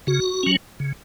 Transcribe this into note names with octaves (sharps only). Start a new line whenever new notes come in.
C#3 F#4
F#3 C#4
C#3